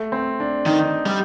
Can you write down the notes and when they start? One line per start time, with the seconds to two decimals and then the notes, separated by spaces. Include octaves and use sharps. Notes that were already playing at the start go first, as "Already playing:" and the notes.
Already playing: A3
0.12 C4
0.40 D4
0.66 D#3 D#4
1.06 G3